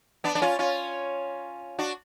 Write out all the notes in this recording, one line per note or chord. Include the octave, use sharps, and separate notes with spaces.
B3 D4
D4
C#4 F4
C#4 F4
D4 F#4